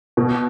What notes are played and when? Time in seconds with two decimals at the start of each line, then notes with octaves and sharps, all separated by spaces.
0.17 B2